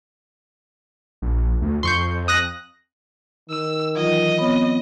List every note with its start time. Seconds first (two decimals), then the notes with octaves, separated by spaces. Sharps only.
1.22 A#1
1.62 D2
1.83 F2 C6 C#6 G6
2.28 D#6 F#6 A#6
3.50 D#3 E6
3.95 E3 F#3 F4 D#5
4.38 B3 C4 C#5